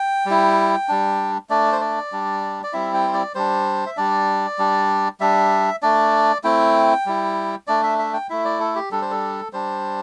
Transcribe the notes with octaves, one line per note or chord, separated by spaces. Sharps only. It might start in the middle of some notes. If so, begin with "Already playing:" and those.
Already playing: G5
G3 E4
G3 D4
A3 D4 D5
C5
D5
G3 D4
D5
G3 C4 E4 E5
G5
C5
D5
G3 D4 C5
E5
G3 D4 D5
G3 D4
G3 D4 E5
A3 D4 D5
A3 C4 E4 G5
G3 E4
A3 D4 D5
E5
E5
G5
A3 E4 E5
D5
A4
G4
G3 D4 A4
C5
A4
G3 D4 C5